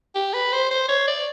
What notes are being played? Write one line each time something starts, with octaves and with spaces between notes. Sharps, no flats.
G4
B4
C5
C5
C#5
D5